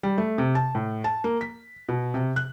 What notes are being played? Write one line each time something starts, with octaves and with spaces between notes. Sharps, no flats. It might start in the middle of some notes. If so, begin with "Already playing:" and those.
G3
A3
C3
A5
A2
A5
A#3
B6
B2
C3
F#6